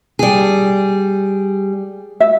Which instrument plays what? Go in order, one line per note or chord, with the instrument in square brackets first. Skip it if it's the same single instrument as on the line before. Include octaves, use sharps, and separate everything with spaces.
[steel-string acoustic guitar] G3 G#4
[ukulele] E5